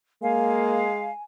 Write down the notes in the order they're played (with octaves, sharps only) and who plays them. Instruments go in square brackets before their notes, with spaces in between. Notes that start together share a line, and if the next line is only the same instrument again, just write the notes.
[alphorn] G#3 [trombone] A#3 [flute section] F5 [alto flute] G#5